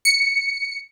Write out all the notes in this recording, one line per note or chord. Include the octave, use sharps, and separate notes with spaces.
C#7